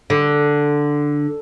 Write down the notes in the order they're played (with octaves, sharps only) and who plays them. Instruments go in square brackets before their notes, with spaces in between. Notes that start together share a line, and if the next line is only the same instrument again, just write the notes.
[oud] D3